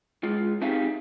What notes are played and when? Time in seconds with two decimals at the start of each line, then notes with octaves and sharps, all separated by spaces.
0.23 G#3 F4
0.61 C4 D#4 G4 G#4 E5 F5